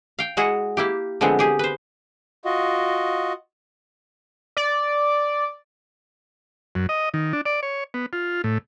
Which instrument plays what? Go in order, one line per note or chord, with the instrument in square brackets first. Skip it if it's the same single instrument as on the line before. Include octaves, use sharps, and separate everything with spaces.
[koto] F5 G5
G#3 E4 F#4 G#4 F#5
A#3 E4 G4
D3 F3 G#3 B3 C4
G4 G#4
B4 C5
[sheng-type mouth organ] F4 F#4 D#5
[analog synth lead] D5
[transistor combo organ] F#2
D#5
D#3
D4
D5
C#5
B3
F4
A2